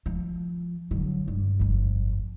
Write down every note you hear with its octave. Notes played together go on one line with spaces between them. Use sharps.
F3
D3 F#3
G2
G1 F2